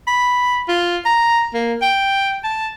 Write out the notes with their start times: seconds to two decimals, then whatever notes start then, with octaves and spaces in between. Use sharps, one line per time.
0.08 B5
0.68 F4
1.06 A#5
1.54 A#3
1.82 G5
2.44 A5